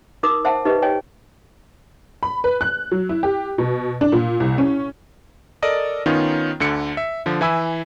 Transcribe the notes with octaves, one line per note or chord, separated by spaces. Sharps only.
D#4 A#4 D6 D#6
C5 E5 F#5 A5
D#4 G4 B4 D#5
C#5 D#5 G5 G#5
B5
B4
F#6
F#3
E4
G4
B2
D4
A#2
C2
C#4
A4 A#4 D5 D#5 D#6
D#3 B3 C#4 D#4 F4 C#5
D2 D3 C#7
E5
D3 F3
E3 E4 G#5 B5 E6